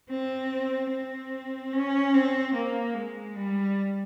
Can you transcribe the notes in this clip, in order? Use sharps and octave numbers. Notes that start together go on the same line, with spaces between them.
C4
C4
C#4
C4
A#3
G#3
G3